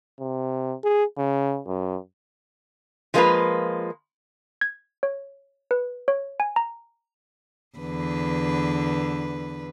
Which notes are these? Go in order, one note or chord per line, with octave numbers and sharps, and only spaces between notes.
C3
G#4
C#3
F#2
F3 G#3 A#3 D4 F4 B4
G#6
C#5
B4
C#5
G#5
A#5
E2 D3 B4